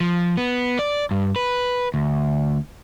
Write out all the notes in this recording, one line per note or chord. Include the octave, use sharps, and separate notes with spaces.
F3
B3
D5
G2
B4
D2